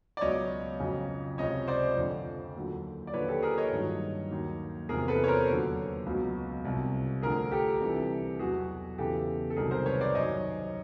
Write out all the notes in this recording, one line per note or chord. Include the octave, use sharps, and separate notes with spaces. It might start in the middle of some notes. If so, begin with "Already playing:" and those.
D5
C#2 B2 F#3 C#5 D#5
F2 C#3 F#3
C#2 C3 F3 C#5 D#5
C5 D5
F2 D3 F3
D#2 D3 F#3
D5
D#2 D3 F3 B4 C#5
G4 A4
G#4 A#4
C#5 D#5
G2 D#3 F#3
D#2 D#3 F#3
E2 C3 F3 G#4 A#4
A4 B4
C#5
A#4 C5
D#2 D3 F#3
C#2 B2 F#3
C2 C3 F3
D2 D3 F3 G#4 A#4
G4 A4
C2 C3 E3
E2 B2 F#3 F#4 G#4
E2 C#3 E3 G4 A4
A4
C2 C3 D#3 F#3 G#4 A#4
A#4 C5
B4 C#5
C5 D5
F#2 D#3 F#3 C#5 D#5